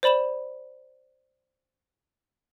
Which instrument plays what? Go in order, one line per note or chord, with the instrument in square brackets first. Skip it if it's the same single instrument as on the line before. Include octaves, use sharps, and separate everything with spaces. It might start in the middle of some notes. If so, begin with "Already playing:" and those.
[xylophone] C5 D5 B5 E7 F#7